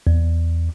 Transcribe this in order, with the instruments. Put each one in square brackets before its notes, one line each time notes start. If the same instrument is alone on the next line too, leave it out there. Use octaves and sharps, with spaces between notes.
[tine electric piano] E2